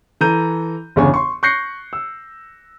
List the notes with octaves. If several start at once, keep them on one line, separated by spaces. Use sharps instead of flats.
E3 A4 A#5 G6 D#7
G1 E2 C#3 D4 G#5 C#6
C6 C#6
C#6 F#6 G6 A#6 C7 C#7
E6